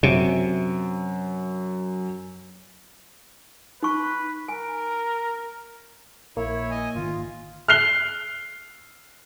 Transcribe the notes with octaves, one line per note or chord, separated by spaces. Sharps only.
F#2 C3
D#4 B4 C#6
A#4 G#5
A#1 A#3 E4 C#5
D#5 G#5
G#1 D3 D#3 F4
F6 F#6 C7 F7 G7